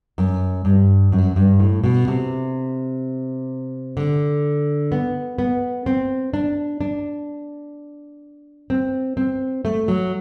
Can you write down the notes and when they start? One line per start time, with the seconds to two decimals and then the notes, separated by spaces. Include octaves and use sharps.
0.18 F#2
0.65 G2
1.12 F#2
1.36 G2
1.59 A2
1.84 B2
2.08 C3
3.97 D3
4.92 B3
5.39 B3
5.86 C4
6.34 D4
6.81 D4
8.70 C4
9.17 C4
9.65 A3
9.88 F#3